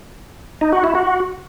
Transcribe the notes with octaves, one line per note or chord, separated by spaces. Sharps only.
D#4
F#4
E4
F#4